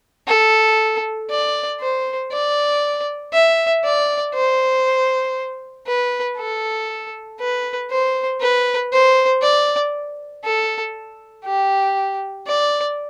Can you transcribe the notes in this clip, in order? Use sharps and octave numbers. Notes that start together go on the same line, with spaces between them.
A4
D5
C5
D5
E5
D5
C5
B4
A4
B4
C5
B4
C5
D5
A4
G4
D5